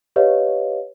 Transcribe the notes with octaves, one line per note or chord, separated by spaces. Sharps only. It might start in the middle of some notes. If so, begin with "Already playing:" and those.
G4 B4 C#5 D#5 F5